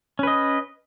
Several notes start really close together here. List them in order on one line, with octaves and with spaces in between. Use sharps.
C#4 B4 D#5